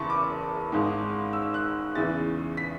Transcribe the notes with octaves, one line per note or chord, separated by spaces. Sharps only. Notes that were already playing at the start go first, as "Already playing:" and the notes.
Already playing: F#1 E2 C#3 E3 A5 B5 C#6
D6
G#1 G#2 G#3
E6
F#6
E2 C#3 E3 A6
B6